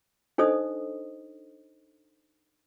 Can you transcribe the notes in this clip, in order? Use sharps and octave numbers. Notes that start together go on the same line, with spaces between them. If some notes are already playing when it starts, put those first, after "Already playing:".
D4 D#4 A4 C5 D#5 D#6